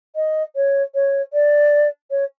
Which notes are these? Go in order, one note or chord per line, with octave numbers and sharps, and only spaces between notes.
D#5
C#5
C#5
D5
C#5